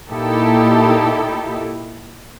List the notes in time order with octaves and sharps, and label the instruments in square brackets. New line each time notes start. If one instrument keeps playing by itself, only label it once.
[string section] A#2 D#4 E4 G4 A4